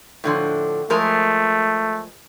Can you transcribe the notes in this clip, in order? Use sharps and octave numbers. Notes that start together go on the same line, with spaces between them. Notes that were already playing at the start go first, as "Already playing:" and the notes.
A2 D3 F3
F3 G#3 A3 A#4